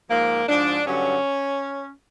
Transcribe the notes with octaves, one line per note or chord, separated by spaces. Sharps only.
G#2 F3 A#3
G#2 F3 D4
G2 D3 F#3 C#4